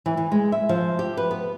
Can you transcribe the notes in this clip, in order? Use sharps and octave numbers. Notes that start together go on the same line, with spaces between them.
E3
E3
G#3
E5
F3
G4
B4
B3